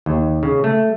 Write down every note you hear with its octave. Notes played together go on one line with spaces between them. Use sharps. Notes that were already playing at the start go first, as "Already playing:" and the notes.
D#2
C#3
A3